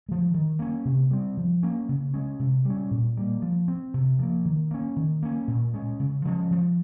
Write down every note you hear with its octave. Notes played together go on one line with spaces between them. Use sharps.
F3 G#3
D#3
A#3 C#4
C3
G3 C4
F3
A#3 C#4
C#3
G#3 C#4
C3
G3 C#4
A#2
G3 A#3
F3
C4
C3
F3 A#3
D#3
A#3 C#4
D#3
A#3 C#4
A#2
G#3 C#4
C#3
F3 G#3 C#4
F3